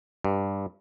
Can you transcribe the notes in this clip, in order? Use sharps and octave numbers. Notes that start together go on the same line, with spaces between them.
G2